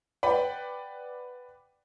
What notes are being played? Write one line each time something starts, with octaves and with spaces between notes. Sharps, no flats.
B4 D5 F#5 G5 B5